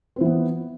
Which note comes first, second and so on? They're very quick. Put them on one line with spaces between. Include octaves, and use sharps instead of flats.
C4 E3 B3